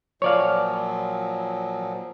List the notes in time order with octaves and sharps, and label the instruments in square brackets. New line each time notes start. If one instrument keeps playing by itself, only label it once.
[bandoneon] A#2 F3 F#3 [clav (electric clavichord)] C#5 D5 F5